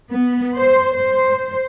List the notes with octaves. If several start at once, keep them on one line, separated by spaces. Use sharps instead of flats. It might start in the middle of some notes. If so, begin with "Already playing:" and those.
B3
C5
C5